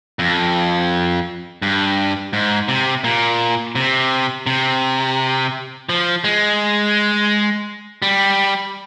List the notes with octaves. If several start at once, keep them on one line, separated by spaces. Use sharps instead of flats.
F2
G2
G#2
C3
A#2
C3
C3
F3
G#3
G3